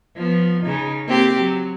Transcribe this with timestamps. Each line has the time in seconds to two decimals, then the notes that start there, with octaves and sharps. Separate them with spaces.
0.16 F3 B3
0.62 C#3 D#4
1.07 A#3 C4 G4
1.39 F#3